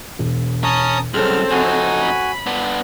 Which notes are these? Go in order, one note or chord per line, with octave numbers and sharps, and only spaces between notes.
E1
C#4 A5 A#5 D#6
C2 F#2 C4 C#4 G#4 A4 F6
F2 D#4 F#4 G#5
B5
B3 D4